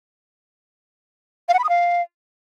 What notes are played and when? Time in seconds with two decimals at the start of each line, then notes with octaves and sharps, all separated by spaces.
1.49 F5
1.54 F#5
1.59 B5
1.64 D#6
1.69 F5